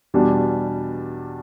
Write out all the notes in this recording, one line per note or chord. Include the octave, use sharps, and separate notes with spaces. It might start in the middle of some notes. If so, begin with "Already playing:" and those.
E2 B2 G3 D4